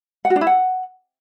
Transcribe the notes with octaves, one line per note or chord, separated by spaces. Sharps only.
F#5
F#4
D4
E4
F#5